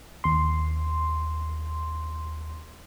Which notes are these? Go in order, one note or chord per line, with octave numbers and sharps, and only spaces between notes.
D#2 C6